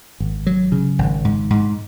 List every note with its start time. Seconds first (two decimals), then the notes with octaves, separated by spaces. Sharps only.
0.20 G#1
0.47 F#3
0.72 C#3
0.99 G#1
1.25 G#2
1.50 G#2